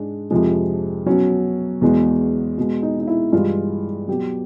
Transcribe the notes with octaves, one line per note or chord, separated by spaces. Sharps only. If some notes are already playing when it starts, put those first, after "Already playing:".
Already playing: G#2 G#3 D4
F2 C3 F3 G#3
B2 F#3 C#4
E2 B2 G#3
B2 G#3
D#4
D#4
E4
G2 E3 G#3 F4
B2 F#3 G4